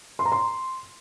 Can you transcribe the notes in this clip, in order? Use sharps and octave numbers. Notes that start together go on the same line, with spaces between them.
C6
A#5
C6